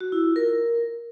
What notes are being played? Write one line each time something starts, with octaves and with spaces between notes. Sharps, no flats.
F#4
E4
F4
A#4